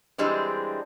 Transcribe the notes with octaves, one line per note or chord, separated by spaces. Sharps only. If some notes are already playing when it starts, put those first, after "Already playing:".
E3 G3 G#3 C4 D4